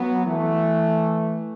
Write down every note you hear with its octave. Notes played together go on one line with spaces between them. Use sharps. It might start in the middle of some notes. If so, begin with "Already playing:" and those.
Already playing: F#3 B3
E3 A3